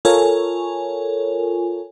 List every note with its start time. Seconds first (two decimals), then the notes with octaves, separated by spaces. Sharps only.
0.05 F4 A4 A#4 C#5 G#5